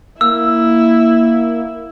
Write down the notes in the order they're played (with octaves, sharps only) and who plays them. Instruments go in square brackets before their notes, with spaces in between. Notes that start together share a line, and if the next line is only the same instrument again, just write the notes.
[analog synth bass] A#3 [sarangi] E4 [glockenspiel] E6